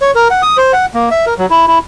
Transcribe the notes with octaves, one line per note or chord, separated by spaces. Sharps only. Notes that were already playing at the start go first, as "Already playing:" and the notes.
C#5
A#4
F#5
D#6
C5
F#5
A#3
E5
A#4
F#3
E4
E4